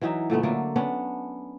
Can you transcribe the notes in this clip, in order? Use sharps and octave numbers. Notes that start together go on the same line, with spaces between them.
E3 F#3 D#4 E5
A#2 D3 A3 B3
D3 F#3 A3 A#3
B3 C#4 D4